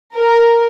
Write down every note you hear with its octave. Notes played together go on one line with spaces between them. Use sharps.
A#4